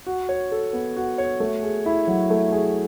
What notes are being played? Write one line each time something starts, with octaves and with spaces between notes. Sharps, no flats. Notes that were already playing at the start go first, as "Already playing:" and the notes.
F#4
C#5
A4
B3
F#4
C#5
A3
G#4
E4
F#3
A3
G#4